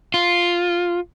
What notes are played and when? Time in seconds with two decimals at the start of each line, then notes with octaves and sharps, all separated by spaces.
0.14 F4